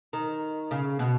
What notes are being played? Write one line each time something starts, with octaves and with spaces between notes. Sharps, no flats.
D#3
C#3
B2